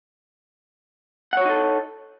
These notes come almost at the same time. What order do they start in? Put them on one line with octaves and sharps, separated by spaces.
F#5 C#5 F#4 D#4 A4